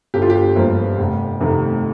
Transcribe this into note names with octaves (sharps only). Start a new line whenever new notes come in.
G1 G4
F4
G4
G2 F3 A#3
F1
F2 C3 D#3 A3